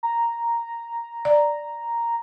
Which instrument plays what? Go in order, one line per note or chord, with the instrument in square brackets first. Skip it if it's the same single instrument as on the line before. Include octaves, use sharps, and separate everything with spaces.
[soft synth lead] A#5
[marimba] D5